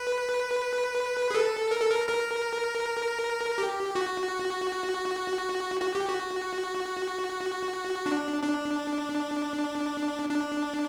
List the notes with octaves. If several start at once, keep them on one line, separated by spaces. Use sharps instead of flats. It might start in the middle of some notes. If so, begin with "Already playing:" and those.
Already playing: B4
G#4
A4
A#4
A4
A#4
A#4
G4
F#4
F#4
G4
F#4
D4
D4
D4